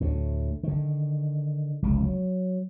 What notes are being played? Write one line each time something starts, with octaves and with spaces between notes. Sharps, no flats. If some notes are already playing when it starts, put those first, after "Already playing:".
D2 A2
D3 D#3
F1 C#2 C#3
F#3